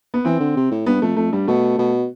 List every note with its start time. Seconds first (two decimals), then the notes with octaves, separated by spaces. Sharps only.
0.14 B3
0.25 E3 C4
0.40 D3
0.57 C3
0.71 A2
0.86 G2 B3
1.02 F2 A3
1.17 F2 A3
1.32 G2 G3
1.47 B2 A3
1.78 B2